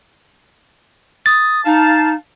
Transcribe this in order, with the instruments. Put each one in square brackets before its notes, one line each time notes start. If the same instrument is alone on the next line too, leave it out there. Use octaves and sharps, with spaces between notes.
[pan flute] D#6 [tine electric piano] A6
[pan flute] D#4 [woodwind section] F5 A5